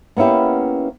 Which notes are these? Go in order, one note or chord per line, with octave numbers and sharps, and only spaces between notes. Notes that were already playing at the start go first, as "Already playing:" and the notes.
A#3 B3 C#4 E4 G4